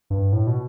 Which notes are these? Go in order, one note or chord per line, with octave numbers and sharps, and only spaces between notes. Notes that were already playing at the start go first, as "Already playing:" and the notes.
G2
A2
B2